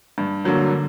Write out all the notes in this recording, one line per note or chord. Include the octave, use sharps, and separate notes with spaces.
G2
D3 F#3 A#3
D3